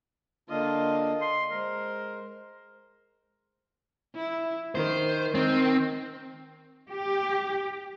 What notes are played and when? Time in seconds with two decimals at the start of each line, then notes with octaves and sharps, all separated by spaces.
0.50 D3 A#3 D4 F4 D#5
1.21 C6
1.51 G#3 A#4 C5
4.15 E4
4.75 D#3 C5
5.35 D#3 C4
6.90 G4